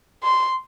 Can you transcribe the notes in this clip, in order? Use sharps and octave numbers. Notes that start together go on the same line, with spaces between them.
C6